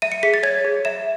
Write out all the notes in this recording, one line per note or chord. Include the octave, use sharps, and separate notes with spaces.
E5 D#7
C#7
G#4 B6
A6
C#5 G#6
G#4
E5 E7